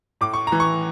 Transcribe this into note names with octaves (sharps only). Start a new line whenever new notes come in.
A2 D6
C#6
E3 A#5
C#6